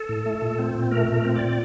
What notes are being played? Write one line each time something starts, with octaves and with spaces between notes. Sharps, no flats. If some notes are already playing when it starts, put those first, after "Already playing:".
Already playing: A4
A2
A3
A#2
C4
A#2
A3 A#4
A#2
A#4
C4
D5
A#2